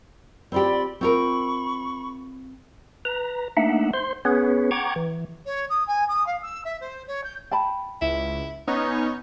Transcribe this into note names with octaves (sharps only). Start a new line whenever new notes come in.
C4 F4 G4 D5 B5 C6
C4 F4 A#4 B5 C#6
B4 A#5
A3 A#3 D4 D#4 E5 F#5
C5 C6
B3 C#4 G#4 B4 C#5
F#5 G5 A#5 C#6 D6 G#6
E3
C#5
D#6
G#5
D#6
F5
E6
E5
C5
C#5
G6
G5 A5 B5
C#2 E4
B3 C#4 D#4 C#5